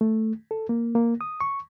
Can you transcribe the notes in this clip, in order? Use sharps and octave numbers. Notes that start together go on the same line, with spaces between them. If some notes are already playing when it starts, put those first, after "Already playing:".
A3
A4
A#3
A#3
D#6
C#6